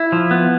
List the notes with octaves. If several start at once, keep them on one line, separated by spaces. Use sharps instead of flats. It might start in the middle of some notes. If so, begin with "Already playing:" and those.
Already playing: E4
F3
B3